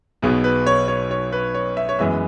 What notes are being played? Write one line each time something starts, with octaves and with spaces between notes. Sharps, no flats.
B1 B2 B3 G#4
B4
C#5
C#5
C#5
B4
C#5
E5
C#5
F#2 E3 G#3 B3 E5